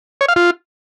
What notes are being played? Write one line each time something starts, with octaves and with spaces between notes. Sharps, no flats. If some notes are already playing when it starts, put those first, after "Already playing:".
C#5
F5
F4